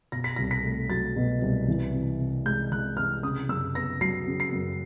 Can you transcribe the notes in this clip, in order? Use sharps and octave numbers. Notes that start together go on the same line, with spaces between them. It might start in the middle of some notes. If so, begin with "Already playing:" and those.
B2 A#6
B6
C2 A#6
B6
A3
F#3 A6
B2
C2
E3
C3
C3
G#3 G6
E3 F#6
C3 F6
C#3 D#6
F#2 E6
B3 A#6
F#3 C7
C#3
C7
F#2